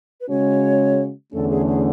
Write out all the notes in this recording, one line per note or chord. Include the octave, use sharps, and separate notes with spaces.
B4
C#3 G#3 C#4 F#4 C#5
E2 D3 A3 C#4 A4
G#4
G#4